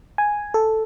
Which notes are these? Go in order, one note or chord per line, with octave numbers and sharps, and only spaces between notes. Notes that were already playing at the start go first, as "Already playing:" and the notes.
G#5
A4